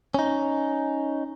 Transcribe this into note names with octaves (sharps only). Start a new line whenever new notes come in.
C#4 D#4